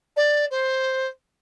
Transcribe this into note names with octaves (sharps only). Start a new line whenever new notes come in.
D5
C5